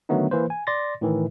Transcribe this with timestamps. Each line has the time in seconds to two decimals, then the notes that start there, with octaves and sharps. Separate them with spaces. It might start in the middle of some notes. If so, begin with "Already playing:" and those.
0.09 D3 D#3 F#3 A3 B3 D#4
0.31 E3 A#3 B4 C5
0.50 G#5
0.67 D5 C6 A6 A#6
1.01 A2 D#3 E3